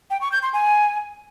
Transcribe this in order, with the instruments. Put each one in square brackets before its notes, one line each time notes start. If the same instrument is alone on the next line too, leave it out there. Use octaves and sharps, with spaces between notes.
[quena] G5
C#6
G6
C6
G#5